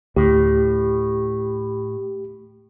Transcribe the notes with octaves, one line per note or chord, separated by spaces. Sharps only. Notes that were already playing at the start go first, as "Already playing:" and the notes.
D2 A2 G4